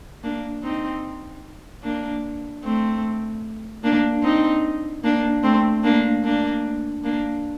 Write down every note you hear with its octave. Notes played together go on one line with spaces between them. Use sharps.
A#3 D4
C4 D#4
A#3 D4
A3 C4
A#3 D4
C4 D#4
A#3 D4
A3 C4
A#3 D4
A#3 D4
A#3 D4